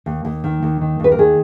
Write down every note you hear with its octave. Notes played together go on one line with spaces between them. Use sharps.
D#2
D#2
D#3
D#2
D#3
D#2 B4
A#4
D#3 G#4